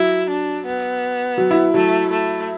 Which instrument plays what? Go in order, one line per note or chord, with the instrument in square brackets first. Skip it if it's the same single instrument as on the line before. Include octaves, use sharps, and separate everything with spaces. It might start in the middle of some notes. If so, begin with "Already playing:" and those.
Already playing: [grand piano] F#3 [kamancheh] E4
[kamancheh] D4
B3
[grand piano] F#3
E4
[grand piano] F#3 [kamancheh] A3
[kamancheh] A3